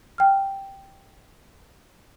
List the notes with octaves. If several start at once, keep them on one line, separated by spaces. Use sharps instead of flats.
G5 F6